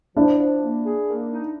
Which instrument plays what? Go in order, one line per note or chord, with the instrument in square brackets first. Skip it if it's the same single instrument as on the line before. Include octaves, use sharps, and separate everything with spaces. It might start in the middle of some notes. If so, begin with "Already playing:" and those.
[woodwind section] F3 [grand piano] D4 E4
[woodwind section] F3
A#3
G#4
A#3
D#4